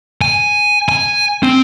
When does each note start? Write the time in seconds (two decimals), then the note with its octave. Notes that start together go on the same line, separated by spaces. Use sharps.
0.21 G#5
0.89 G#5
1.43 C4